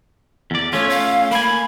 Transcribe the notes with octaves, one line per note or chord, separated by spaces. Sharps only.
E2 D5
A3 C#4 F4 C#5
F5
A#3 G#5 B5